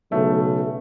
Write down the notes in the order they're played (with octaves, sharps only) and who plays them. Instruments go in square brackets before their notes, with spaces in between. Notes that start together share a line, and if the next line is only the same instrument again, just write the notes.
[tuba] B1 [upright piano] C#3 A3